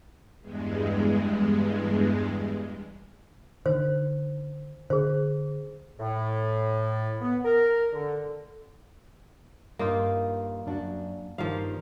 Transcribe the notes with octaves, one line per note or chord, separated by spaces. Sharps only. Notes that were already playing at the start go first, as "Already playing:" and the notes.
E2 G2 G#3
D3 D#3 C5
D3 G#4 C5
A2
B3
A#4
D3
G2 A#3 D#4 F4
F#2 D4 F#4
G2 D#3 F3 G3 A#3 F5